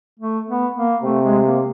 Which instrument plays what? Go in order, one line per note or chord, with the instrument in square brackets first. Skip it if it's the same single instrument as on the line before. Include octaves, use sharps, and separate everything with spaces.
[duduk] A3
B3
A#3
[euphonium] C3 [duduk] A3
[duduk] G#3
A#3